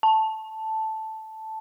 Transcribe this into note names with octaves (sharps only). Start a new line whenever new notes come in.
A5